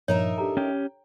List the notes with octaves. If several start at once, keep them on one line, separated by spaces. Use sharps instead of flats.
G2 A#2 F3 D#4 A#4 C#5 E5
D4 G4 A4 A#5
C#4 G4 G5